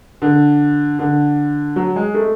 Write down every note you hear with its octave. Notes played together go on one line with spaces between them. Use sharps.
D3
D3
F#3
G#3
A3